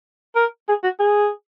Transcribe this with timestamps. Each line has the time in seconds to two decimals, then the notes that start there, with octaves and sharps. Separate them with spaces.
0.36 A#4
0.68 G#4
0.84 F#4
1.00 G#4